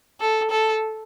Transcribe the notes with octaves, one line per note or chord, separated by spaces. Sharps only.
A4
A4